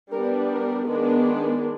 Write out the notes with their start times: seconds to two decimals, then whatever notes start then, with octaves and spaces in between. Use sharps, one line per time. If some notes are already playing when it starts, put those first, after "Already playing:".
0.12 G3 B3 D4 A#4
0.50 A#4
0.89 D#3 G#3 B3 D4